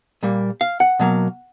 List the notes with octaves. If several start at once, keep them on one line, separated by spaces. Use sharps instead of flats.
A#2 G3 A#3
F5
F#5
B2 F#3 A#3